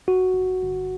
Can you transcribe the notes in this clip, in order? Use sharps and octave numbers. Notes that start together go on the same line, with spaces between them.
G1 F#4
G1
G1